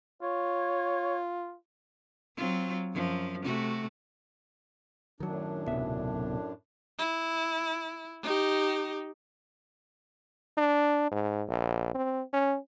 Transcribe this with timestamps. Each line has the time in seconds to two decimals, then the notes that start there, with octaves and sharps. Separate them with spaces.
0.22 F4 C#5
2.36 F#3 C4 F4
2.93 F#2 F3 F#3
3.43 C3 A3 F#4
5.20 F#2 A2 D#3 F#3 D4
5.68 D1 B1 C3 B3 E5
6.98 E4
8.23 D#4 G4
10.58 D4
11.12 G#2
11.48 A#1
11.95 C4
12.33 C#4